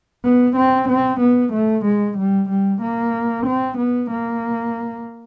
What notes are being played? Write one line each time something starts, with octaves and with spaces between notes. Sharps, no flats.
B3
C4
C4
B3
A3
G#3
G3
G3
A#3
C4
B3
A#3